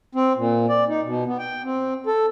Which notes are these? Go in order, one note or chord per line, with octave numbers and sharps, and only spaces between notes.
C4
A#2
D5
D#4
B2
B3
G5
C4
A4